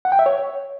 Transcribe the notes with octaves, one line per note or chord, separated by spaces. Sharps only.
F#5
G5
E5
C#5